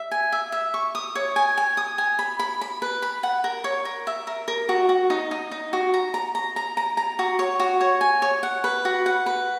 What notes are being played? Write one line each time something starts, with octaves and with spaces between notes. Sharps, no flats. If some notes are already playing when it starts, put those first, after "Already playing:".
Already playing: E5
G#5
E5
E5
C#6
D#6
C#5
G#5
G#5
D#6
G#5
B5
B5
B5
B4
B5
F#5
A#4
C#5
A#4
E5
A#4
A#4
F#4
F#4
D#4
D#4
D#4
F#4
A#5
A#5
A#5
A#5
A#5
A#5
F#4
C#5
F#4
C#5
G#5
C#5
F#5
B4
F#4
F#5
B4